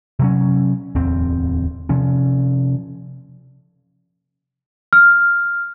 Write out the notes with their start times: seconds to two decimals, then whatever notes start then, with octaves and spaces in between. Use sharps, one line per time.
0.19 C3 F#3 C#4
0.95 D1 E2 C4
1.89 C3 F3 C#4
4.93 F6